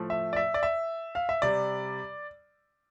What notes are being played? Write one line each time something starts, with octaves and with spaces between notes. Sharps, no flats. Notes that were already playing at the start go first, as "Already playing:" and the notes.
Already playing: A2 F3 A3
E5
D5
E5
D5
E5
F5
E5
C3 G3 D5